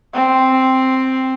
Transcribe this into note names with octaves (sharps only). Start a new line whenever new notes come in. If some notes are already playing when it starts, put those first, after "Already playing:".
C4